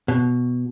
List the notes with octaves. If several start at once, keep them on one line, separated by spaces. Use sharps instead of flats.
B2